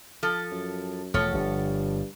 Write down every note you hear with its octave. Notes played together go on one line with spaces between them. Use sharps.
F3 A4
F#2
E1 F3 A3 A4 C#5
G1 G2